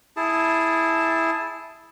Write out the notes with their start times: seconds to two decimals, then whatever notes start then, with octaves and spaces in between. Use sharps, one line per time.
0.16 E4 G#4 A5